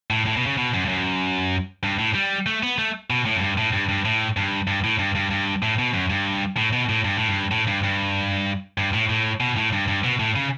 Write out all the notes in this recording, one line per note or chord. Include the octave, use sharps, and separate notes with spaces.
A2
A2
B2
C#3
B2
F#2
G2
F#2
G2
A2
G3
A3
B3
A3
B2
A2
F#2
G2
A2
G2
G2
A2
G2
G2
A2
G2
G2
G2
A2
B2
F#2
G2
A2
B2
A2
G2
A2
G2
A2
G2
G2
G2
A2
A2
B2
A2
G2
G2
B2
A2
C#3